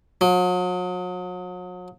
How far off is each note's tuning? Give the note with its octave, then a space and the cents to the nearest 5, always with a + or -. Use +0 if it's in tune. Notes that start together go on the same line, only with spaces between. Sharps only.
F#3 -40